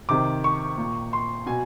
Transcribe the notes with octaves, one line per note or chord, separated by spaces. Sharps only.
C3 D#3 D6
C#6
A#2
C6
B2 G#5